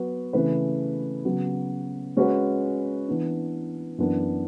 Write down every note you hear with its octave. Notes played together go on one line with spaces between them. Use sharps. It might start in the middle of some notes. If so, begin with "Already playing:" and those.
Already playing: F#3 B3 F#4 B4
C#3 E3 A3 E4 B4
C#3 F#3 B3
G#3 C#4 F#4 B4
E3 B3 D4
F#2 E3 B3 D4